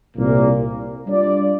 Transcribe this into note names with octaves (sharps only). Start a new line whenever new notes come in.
C2 A#2 A#3
G3 D4 F4 D5